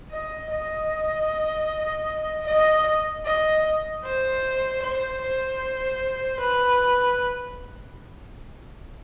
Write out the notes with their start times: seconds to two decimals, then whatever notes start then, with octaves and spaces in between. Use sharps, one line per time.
0.12 D#5
0.51 D#5
2.48 D#5
3.25 D#5
4.04 C5
4.83 C5
5.22 C5
6.41 B4